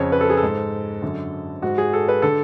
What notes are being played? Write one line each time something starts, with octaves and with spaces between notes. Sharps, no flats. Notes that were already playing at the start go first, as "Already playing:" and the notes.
Already playing: F2 C#3 C#5
B4
A4
G#4
A4
G#2
F#2 D3
G#2 F#4
G#4
A4
B4
D3 A4